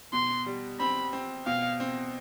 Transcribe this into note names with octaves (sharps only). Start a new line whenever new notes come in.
B2 C6
G3
C4 B5
C4
B2 F5
C4